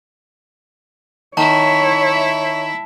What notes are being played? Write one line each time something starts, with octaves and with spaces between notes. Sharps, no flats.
D#3 E4 C#5 E5 A5